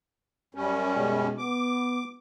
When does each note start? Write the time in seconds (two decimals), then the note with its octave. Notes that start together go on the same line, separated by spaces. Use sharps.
0.55 F#2 G3 C#4
0.97 B2 G#3
1.38 B3 D6